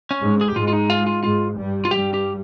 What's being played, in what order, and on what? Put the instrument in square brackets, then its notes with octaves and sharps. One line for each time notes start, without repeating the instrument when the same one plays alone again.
[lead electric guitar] C#4
[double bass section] G#2 G#3
[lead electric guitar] G#4
G4
[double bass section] G#2 G#3 [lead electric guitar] F4
[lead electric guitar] F4
D#4
F4
F4
[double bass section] G#2 G#3 [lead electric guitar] F4
[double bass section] G2 G3
[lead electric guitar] F4
[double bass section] G2 G3 [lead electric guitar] G4
[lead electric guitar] G4